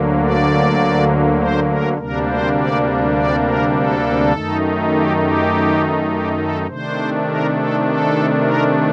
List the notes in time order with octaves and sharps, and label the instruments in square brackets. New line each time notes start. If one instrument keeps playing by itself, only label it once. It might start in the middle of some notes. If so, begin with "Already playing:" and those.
Already playing: [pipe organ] D2 D3 F#3 A#3
D5
C5
A#4
D2 C3 G3 A#3 D4 A#4
C5
D5
D5
A#4
A4
F#2 D#3 A3 D#4
G4
G4
G4
A4
C3 D#3 A3 D4 C5
A#4
A4
A4
A#4